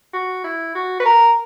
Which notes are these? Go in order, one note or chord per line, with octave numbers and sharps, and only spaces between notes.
F#4
E4
F#4
B4
A#4